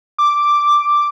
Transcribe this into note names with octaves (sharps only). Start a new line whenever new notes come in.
D6